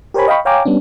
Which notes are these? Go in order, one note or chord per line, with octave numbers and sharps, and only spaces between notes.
G4 A#4 C5 C#5 G#5 B5
D#5 F5 G5 B5 C#6
C#5 F5 G5 G#5 A#5 D6
G3 B3 C#4 D4